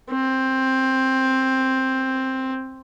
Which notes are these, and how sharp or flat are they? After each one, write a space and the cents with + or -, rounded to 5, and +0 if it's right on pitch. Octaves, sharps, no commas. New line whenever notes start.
C4 +10